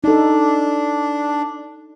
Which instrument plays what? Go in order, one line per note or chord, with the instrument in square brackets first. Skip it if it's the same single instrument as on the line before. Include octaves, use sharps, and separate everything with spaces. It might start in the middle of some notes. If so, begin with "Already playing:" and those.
[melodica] D4 [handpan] D#4 A4